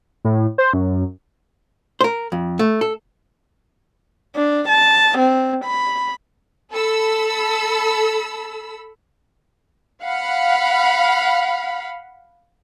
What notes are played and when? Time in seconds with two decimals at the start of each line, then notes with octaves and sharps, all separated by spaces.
0.25 A2
0.58 C5
0.73 F#2
2.01 A#4 C5
2.32 F2
2.59 A3
2.81 A4
4.35 D4
4.69 A5
5.18 C4
5.64 B5
6.72 A4 B5 E6
10.04 F5 F#5 B5